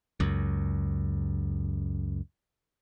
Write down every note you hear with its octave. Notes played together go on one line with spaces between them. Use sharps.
C#2 F#2